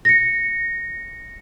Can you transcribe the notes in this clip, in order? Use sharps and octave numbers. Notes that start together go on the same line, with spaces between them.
A#6 C#7